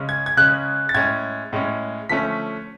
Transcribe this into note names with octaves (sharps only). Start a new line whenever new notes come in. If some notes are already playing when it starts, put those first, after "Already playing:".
Already playing: C#3 G#3 C#4
G#6
G#6
C#3 G#3 C#4 F#6
A6
A2 G#3 C#4 G#6
A2 G#3 C#4
D3 F3 A3 C#4 B6